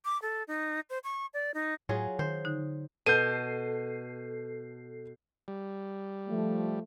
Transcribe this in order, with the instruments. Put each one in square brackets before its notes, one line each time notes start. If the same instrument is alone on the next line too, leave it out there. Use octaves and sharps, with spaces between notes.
[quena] D6
A4
D#4
C5
C#6
D5
D#4
[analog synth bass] A2 [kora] F#3 F4 G#4 [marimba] F5
[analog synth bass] D#3 [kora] C5
[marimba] D3 D#4
[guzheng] B2 [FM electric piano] A4 C7 [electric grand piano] G6 D#7
[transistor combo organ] G3
[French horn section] F3 A3